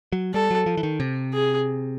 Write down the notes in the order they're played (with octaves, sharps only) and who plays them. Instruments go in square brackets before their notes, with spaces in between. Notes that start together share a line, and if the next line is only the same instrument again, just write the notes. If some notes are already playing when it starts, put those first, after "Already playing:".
[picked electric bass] F#3
[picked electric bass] G3 [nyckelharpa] A4
[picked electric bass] F#3
F3
E3
D#3
C3
[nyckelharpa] G#4